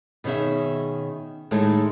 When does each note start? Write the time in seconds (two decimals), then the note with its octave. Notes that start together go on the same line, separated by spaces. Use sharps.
0.24 B2 D#3 C#4 G#4 E5
1.51 A2 D#3 G#3 A3 E4 A4